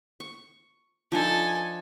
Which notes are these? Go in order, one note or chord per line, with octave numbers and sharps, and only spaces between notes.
C#6
F3 D4 D#4 A4 G#5